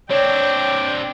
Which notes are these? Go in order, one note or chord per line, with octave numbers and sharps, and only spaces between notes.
C4 D4 C#5 D5 G5